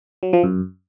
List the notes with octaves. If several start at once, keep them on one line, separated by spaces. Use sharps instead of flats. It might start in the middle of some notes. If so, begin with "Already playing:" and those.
F#3
F3
F#2